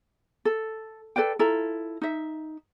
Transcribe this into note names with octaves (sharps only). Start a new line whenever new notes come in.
A4
A4 B4 D5 G5
E4 F4 A4 A#5
D#4 E5